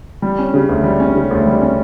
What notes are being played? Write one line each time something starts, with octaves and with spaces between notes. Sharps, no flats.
G3
C#4
C#3
D2
G3
C#4
C#3
D2
G3
C#4